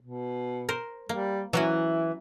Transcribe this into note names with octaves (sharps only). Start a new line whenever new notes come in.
B2
A#4 C5
G3 A#3
E3 F#3 C#4 E4 F#4